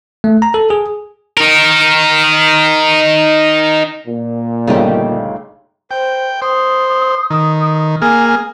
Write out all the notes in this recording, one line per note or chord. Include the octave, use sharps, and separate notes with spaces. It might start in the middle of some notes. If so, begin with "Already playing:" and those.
A3
A#5
A4
G#4
D#4 A#4
A#2
G1 C#3 A3 D#4 G4
C5 G5
C5 D#6
D#3 D#6
A#3 G#4 G#5 F6